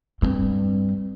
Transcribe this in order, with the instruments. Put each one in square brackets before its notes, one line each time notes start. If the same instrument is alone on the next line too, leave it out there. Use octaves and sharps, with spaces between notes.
[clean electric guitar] B1 G2 [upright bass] C4